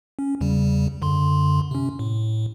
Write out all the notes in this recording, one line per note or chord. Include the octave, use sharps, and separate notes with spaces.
C#4
E2 C#3 G3
F#2 D3 C6
C3 C#4
A2